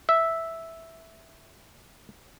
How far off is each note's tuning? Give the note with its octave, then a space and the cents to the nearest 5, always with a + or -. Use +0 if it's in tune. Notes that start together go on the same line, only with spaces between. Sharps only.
E5 -5